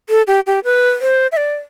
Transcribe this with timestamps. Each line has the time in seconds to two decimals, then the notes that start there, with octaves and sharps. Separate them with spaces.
0.09 A4
0.27 G4
0.47 G4
0.64 B4
1.01 C5
1.32 E5
1.37 D5